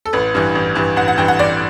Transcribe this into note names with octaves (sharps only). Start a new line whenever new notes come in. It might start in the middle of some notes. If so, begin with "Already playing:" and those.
A4
A1 B4
G2 E3
A1
G2 E3
A1 F#5
F#5
G2 E3 G5
F#5
A1 D5